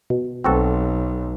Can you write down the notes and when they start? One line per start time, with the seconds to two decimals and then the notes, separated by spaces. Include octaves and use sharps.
0.10 B2
0.44 B1 C4 F#4 A4